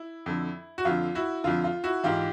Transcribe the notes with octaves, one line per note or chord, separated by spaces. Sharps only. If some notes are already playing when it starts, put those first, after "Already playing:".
Already playing: E4
F2 D3
F#4
F2 D3 F4
E4 F#4
F2 D3 F4
F4
E4 F#4
G#2 E3 F4 G4